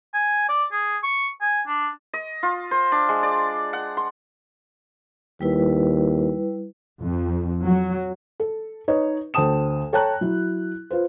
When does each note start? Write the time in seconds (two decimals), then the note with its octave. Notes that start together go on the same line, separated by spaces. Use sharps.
0.13 G#5
0.48 D5
0.72 G#4
1.03 C#6
1.41 G#5
1.67 D4
2.14 D#5
2.43 F4
2.71 C5
2.92 D4
3.09 G#3
3.23 D5
3.73 F#5
3.97 C6
5.41 D#2 G3 E4 B4
7.00 F2
7.63 F#3
8.40 A4
8.88 D#4 B4 C#5 D#5
9.34 D2 C5 G5 A5 D#6 E7
9.93 A4 C#5 G5 A5 A#5 F#6
10.21 F#3 E4
10.90 F4 B4 C5